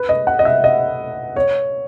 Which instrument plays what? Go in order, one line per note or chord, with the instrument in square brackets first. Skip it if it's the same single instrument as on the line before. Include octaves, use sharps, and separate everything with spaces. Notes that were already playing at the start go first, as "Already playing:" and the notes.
Already playing: [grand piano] B4
D#5
F#5
D#5
E5
D#5
C#5